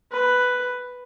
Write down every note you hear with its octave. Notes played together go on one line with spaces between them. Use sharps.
B4